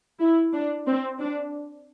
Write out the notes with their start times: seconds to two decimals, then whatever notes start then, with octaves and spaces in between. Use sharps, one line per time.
0.20 E4
0.53 D4
0.87 C4
1.19 D4